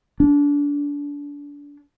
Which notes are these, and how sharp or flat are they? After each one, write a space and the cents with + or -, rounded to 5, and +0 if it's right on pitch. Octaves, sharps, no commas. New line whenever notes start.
D4 -30